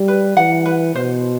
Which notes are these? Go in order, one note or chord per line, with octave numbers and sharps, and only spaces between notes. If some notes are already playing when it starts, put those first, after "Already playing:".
Already playing: G3
B4
E3 F#5
B4
B2 C5